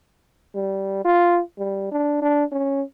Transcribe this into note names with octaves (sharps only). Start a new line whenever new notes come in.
G3
F4
G3
D4
D4
C#4